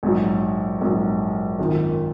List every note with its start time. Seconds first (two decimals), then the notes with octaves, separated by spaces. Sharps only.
0.03 A#1 G#2 F#3
0.81 A#1 G#2 F#3
1.59 G#1 F#2 D#3 A#3 F4